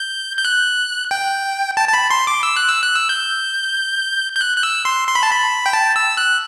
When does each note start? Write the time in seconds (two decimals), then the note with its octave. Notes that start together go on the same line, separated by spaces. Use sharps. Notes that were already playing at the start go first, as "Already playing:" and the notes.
Already playing: G6
0.37 G6
0.45 F#6
1.11 G5
1.77 A5
1.88 A5
1.93 B5
2.10 C6
2.27 D6
2.43 E6
2.56 F#6
2.69 E6
2.83 F#6
2.96 E6
3.09 G6
4.36 G6
4.41 F#6
4.57 F#6
4.63 E6
4.85 C6
5.08 C6
5.15 B5
5.23 A5
5.31 B5
5.66 G5
5.73 A5
5.96 E6
6.17 F#6